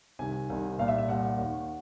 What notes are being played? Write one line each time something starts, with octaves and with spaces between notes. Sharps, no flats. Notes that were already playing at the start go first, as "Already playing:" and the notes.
C2 C3 D#3 G#5
C2 C3 D#3
C2 A#2 F5
E5
E5
C2 A#2 F#5
D#2 D#3